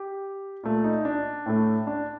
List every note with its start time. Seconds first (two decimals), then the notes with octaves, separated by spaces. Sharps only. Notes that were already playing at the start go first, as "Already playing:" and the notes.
Already playing: G4
0.63 A#2 A3
0.84 D#4
1.05 D4
1.46 A2 A3
1.87 D4